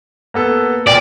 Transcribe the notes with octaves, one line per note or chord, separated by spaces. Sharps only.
A#3 B3 A4
E1 A#2 D5 G5